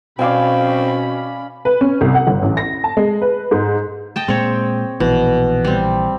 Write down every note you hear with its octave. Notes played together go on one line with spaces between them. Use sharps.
B2 C4 C#4 D5 F5 G#5 B5
B4
C#4
C2
F#5
G1
A1
A#6
A5
G#3
B4
G#2
D#5 G5 A5
A#2 G#3 C4 C#5
A#1 B2 E3
G3 C4